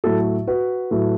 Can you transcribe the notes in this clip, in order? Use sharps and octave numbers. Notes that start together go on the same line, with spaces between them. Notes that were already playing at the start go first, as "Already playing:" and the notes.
A2 F#3 A3 A4
F#4 B4
A2 F#3 A3